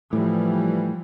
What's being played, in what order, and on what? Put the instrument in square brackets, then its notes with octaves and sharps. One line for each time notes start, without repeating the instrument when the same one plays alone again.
[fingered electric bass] A2 [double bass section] E3 F3 G3